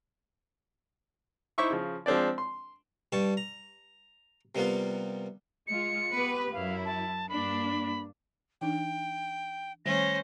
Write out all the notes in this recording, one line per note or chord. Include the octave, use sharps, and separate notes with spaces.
D#4 E4 C5 E5 C#6 D6
C#3 F3
F3 G#3 C4 D4 D5
C6
G2 G3 A5 C#6
A#5
C3 G3 A#3 B3 F4
G#3 F4 C#7
B3 G4 B4
F#2 F#3 E4 F5
A5
G2 A#3 D4 B5
E3 D4 D#4 G5
D#3 G3 A3 C#4 C5 A#6